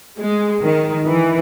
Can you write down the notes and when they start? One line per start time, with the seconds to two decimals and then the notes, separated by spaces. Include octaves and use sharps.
0.18 G#3
0.62 D#3
1.08 E3